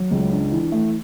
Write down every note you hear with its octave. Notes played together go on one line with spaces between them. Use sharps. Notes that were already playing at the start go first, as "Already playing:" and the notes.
Already playing: F#3
C#2
D4
E3
A3